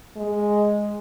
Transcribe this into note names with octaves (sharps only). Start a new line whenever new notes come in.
G#3